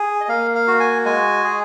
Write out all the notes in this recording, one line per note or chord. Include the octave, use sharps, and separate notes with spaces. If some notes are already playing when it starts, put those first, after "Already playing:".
Already playing: G#4
D#5
A#3 F5
F5
F#4
G#5
G#3 G#5
G#4